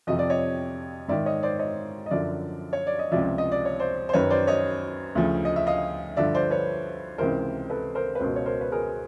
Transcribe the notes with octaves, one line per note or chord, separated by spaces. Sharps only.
F2 C3 F3 D#5
D5
C#5 D#5
G#2 D#3 D5 E5
C#5 D#5
C5 D5
C#5 D#5
D#5
F#2 D3 F3 D5 E5
C#5
D5
D#5
C#2 C3 F3 D5 E5
D#5
D5
C#5
C5 D5
C5
F#2 D#3 B4 C#5
C5 D5
C#5 D#5
D2 C#3 F3
D#5
E5
D#5 F5
G2 D3 F3 D5 E5
C5 D5
B4 C#5
C#2 C3 E3 A#4 C5
A4 B4
A#4 C5
B4
C#2 B2 A#4 C5
C#5
A#4 C5
B4
G#4 A#4